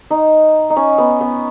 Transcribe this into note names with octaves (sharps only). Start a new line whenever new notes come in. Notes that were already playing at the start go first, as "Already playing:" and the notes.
D#4
D#4
C#4
B3
B3